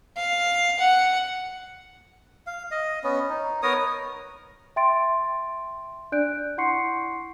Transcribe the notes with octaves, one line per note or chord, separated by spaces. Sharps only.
F5
F#5
F5
D#5
B3 C#4
D#4
B3 A#4 C#5 D#6
E5 G5 C6 A6 D7
D4 D5 F#6 G6 D7
E4 F#5 C6 C#6 C7 C#7